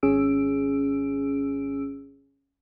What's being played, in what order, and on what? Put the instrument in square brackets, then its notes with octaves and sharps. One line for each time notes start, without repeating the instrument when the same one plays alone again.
[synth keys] G#1 C#4 G#4 E6 D7